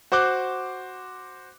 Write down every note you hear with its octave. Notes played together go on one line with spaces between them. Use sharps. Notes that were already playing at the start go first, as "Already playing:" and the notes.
F#4 C5 C6 D6 F#6